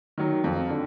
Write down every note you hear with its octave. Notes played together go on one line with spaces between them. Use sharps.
D#3 F#3
F2
D3